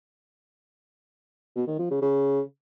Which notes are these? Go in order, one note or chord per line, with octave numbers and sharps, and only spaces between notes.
B2
D#3
F3
C#3
C#3